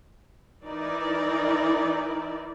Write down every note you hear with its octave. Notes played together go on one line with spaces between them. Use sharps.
E3 D#4 E4 A#4 D5